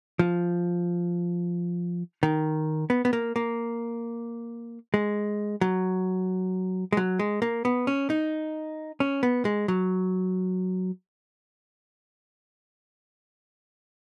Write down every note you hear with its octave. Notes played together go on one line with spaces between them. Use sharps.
F3
D#3
B3
B3
A#3
A#3
G#3
F#3
G#3
F#3
G#3
A#3
B3
C#4
D#4
C#4
B3
G#3
F#3